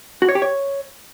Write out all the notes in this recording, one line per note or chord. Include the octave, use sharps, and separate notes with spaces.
F#4
C#5
G4
C#5